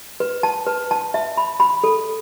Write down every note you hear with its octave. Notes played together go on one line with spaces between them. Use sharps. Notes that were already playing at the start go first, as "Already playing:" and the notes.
B4
A5
B4
A5
E5
B5
B5
A4